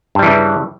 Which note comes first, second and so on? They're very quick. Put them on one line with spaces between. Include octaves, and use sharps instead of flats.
G2 G3 E3 C#3